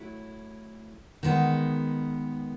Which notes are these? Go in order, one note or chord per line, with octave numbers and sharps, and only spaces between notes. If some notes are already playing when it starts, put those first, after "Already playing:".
Already playing: F#3 A3 E4
D#3 G#3 B3